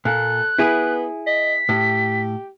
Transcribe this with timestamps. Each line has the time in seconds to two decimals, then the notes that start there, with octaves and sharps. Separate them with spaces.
0.05 A#2 A4 F#6
0.59 B3 E4 G#4
1.26 D#5 B6
1.69 A2 G4